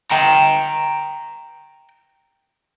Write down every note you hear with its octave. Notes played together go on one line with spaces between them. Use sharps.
G5 A#5